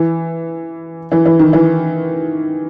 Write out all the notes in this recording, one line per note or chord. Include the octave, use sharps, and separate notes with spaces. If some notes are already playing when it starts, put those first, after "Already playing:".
Already playing: E3
E3
E3
D#3
E3